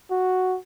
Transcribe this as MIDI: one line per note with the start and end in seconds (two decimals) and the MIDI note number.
0.11 0.58 66